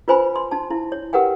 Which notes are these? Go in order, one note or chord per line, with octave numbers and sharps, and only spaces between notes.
F4 B4 C5 G#5 B5
C6
D#4 A5
E4
C#5
G4 A#4 B4 F#5 G5